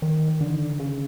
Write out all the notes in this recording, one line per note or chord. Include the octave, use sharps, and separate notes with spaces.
D#3
D3
D#3
D3
C#3